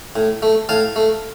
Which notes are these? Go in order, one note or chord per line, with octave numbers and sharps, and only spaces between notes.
A2
A3
A2 F5 A5
A3